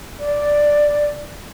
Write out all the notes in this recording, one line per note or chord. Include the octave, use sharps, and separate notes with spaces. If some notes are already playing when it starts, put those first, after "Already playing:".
D5